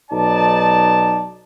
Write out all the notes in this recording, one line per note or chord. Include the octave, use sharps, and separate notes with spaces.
B1 D#4 D5 A5